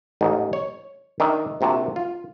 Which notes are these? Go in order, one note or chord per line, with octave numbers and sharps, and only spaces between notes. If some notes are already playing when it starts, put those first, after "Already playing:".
A1 G#2 D#4 D#5
C#5
D#3 D4 E5
A#1 C3 C4 F#4 A5
F4